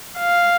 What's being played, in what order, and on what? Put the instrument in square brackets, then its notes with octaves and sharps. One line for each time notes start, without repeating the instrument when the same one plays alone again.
[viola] F5